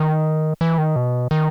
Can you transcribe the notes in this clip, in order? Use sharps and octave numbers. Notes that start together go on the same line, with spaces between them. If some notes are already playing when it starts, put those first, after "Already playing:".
Already playing: D#3
E3
D#3
B2
D#3